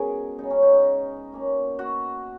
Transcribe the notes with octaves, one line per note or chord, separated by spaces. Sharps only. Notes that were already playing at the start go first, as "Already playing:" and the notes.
Already playing: B2 G#3 C#4 G#4 A#4
C#3 G#3 B3 D#4
C#4
D#4
D#4
B2 A#3 C#4
F#4